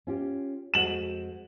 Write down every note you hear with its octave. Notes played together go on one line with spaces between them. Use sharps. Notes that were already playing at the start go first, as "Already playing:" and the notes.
C#4 F4 G4
F2 G#3 F#4 E7 F#7